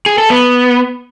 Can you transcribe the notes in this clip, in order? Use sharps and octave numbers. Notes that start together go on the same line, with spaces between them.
G#4
A4
B3